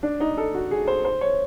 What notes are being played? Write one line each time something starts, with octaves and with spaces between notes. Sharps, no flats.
D4
D#4
A4
F#4
G#4
C5
C5
C#5